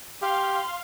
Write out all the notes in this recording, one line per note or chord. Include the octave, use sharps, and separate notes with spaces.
G4 F5 C6